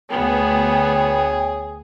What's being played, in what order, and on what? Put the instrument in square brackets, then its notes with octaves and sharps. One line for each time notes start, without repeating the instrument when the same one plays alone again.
[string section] D2 B3 [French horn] G#4 [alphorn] C#5 [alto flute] G5